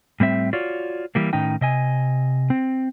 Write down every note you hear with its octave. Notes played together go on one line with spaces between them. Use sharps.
A2 G3 C4 E5
F4 F#4 C#5 D5
E3 G3 A#3
A2 D#3 C#4 D#4 G5
C3 D#5 G#5
C4